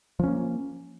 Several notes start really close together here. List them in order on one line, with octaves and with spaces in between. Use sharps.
F3 C#4 A#3